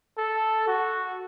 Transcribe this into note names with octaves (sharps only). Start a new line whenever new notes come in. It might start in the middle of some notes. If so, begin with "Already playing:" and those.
A4
F#4